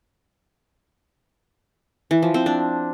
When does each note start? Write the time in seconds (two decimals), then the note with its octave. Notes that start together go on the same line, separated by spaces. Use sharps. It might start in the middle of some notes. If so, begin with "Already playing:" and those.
2.11 E3
2.23 F3
2.34 C4
2.46 D4